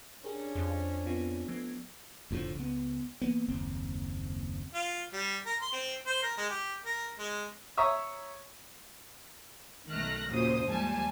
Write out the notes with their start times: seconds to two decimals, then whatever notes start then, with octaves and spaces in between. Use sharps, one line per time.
0.24 C#4 D4 G4 G#4 A#4
0.55 F2
1.06 B3 C4 F4
1.48 F3 A3 B3
2.31 F1 A2 D3 F3
2.55 C#2 B3
3.21 E3 A#3 B3
3.48 F#1 D#2 C4
4.74 F4
5.13 G3
5.46 A#4
5.62 C6
5.73 C4
6.07 C5
6.23 A#4
6.38 G#3
6.50 G4
6.85 A#4
7.19 G#3
7.77 C#5 E5 A#5 C#6 D#6 E6
9.90 B1 D#3 A3 F6 F#6 A#6
10.30 D#2 A#2 C#3 F#3 C5 D#6
10.65 D#2 G#2 F3 G3 G#5 A5